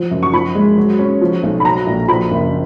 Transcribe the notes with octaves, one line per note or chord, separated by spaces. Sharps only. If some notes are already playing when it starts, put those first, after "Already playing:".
Already playing: F3
F#2
C#6
F3 B5
G#3
F#3
C#4
F3
B1
B5
F#3 A#5
A#1
F3 B5
F#1